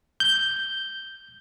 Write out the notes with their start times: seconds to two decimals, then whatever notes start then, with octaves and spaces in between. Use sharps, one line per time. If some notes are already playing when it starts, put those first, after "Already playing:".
0.20 G6